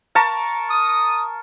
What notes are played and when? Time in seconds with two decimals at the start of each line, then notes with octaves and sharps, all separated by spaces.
0.15 A#4 A5 C#6
0.70 D#6